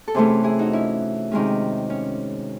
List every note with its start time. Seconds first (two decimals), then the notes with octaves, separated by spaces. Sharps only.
0.08 A4
0.14 C3 E3 A3 C#4 G#4 C5
0.44 E4 G#4
0.59 D#4 F#4
0.73 C#4 E4
1.31 C3 D#3 G#3 C#4
1.90 C#4